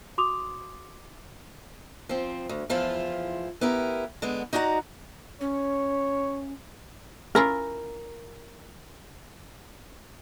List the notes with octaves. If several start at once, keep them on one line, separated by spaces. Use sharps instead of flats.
F#4 C6 D6 D#6 F7
F3 C4
D2
E2 F3 E4 F4
B3 E4 G4 A#4
D3 G#3 B3
D#4 F#4 D5 F#5 G5 A#5
C#4 C#5
C#4 E4 F4 A#4